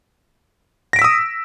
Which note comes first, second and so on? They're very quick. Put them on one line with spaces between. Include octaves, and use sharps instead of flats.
A#6 D7 B6 E6 D#6